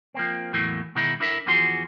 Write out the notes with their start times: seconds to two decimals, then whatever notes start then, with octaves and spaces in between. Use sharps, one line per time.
0.14 F3 A#3 C4
0.53 E2 A2 E3 F#3 A3 A#3
0.95 B2 D#3 G#3 D#4 E4
1.20 D4 E4 A4 A#4 E5
1.46 E2 E3 F3 F#4 G#4 C6